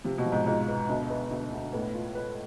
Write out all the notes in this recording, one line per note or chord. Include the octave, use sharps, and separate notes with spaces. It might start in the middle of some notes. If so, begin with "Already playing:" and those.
C3 F3
B2
F3
G#2
G#2 F4
B3
D2 B2
B3
D2
D2
A2 B3
F4
B4